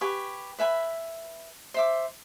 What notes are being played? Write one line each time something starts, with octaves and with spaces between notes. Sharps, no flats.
G4 B4 G#5 C#6
B4 E5 G#5 B5
C5 E5 D6